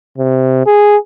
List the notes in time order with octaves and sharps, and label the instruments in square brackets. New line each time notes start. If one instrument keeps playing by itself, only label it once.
[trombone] C3
G#4